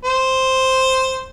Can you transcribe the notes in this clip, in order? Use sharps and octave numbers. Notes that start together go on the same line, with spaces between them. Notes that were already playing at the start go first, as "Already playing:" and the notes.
C5